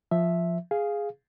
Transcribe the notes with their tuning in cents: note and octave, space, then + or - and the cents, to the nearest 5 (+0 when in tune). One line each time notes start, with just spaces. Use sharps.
F3 +0 E5 +0
G#4 +0 F5 +0